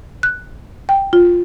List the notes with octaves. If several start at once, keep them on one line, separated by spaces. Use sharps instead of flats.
F#6
G5
F4